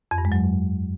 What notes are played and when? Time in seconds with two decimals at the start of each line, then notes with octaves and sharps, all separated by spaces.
0.11 F2
0.18 G2
0.25 G#3
0.32 F#3